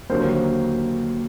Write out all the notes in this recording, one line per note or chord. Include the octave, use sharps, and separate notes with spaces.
D#2 D3 F#3 A#4 C5